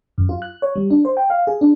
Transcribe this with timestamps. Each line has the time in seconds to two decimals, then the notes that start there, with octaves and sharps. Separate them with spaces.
0.18 F#2
0.29 F4
0.42 F#6
0.62 C#5
0.76 G3
0.90 D4
1.05 C5
1.17 G5
1.30 F5
1.47 G#4
1.61 D4